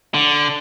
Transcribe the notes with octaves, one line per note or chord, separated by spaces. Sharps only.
D3